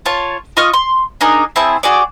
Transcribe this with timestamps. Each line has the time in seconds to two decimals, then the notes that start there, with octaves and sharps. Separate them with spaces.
0.06 F4 C#5 A5
0.57 F4 D#5 C#6 F6
0.73 C6
1.21 D4 D#4 G#4 A#4
1.56 C4 E4 G#4 A5
1.83 F#4 G#4 D5